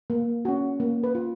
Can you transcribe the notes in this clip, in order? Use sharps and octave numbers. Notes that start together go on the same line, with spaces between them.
A#3
C#4 F#4
A#3
B4
F4